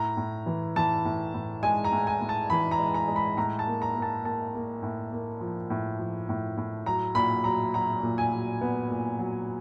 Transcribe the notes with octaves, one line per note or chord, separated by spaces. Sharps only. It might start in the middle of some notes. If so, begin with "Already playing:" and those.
Already playing: A2 A#5
A2
E3
E3 A5
A2
A2
G#3 G#5
A#5
A2
G#5
A2
A5
E3 B5
A#5
G#3
A#5
G#3
B5
A2 A#5
A5
A#3
A#5
A#3
A5
A#3 A5
A#3
A2
A#3
F3
A2
F3
A2
A2
F#3 A#5
A#2 B5
F#3 A#5
F#3 A#5
A#2
G#5
F#3
B3
A#2
F#3